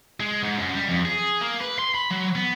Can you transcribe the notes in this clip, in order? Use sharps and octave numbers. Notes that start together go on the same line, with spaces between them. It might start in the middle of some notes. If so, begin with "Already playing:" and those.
G#3
G#2
F#2
G3
F2
G#4
A#3
B4
C6
B5
F#3
B3